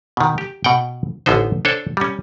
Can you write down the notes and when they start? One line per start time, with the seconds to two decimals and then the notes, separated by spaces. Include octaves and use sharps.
0.17 B2 D#3
0.38 G4
0.64 B2 F#5 G5
1.26 A1 D3 B3 D#4 C5
1.65 D4 A4 C5 C#5
1.97 G3 C#4